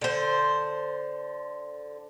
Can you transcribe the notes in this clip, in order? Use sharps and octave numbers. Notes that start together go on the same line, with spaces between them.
D3 C5